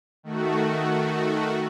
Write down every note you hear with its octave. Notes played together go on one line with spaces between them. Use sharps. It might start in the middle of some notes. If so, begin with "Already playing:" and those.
D#3 A3 F#4